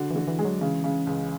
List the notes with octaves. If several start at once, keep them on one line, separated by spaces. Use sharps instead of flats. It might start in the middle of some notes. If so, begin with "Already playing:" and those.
Already playing: D3 F#4
E3
D3
E3
G#3
F#3
C#3 E3
C#3
C#2